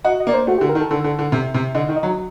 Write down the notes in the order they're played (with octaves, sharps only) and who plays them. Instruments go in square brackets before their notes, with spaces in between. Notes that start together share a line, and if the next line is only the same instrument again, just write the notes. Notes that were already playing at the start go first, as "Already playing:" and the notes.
[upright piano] F#4 [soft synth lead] D#5
[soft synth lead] D#5
[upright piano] A#3 [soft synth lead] D5
[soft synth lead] C5
[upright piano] A3 [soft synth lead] F#4
[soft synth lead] G4
[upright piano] D3
[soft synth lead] A#4
[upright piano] D#3
[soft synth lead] A4
[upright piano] D3 [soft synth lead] A4
[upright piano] D3
D3
C3
C3
[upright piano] D3 [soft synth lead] D#5
[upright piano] D#3
[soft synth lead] D#5
[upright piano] F#3